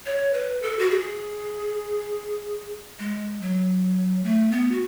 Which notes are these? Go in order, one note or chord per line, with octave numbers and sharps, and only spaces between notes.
C#5
B4
A4
F#4
G#4
G#3
F#3
A3
B3
F#4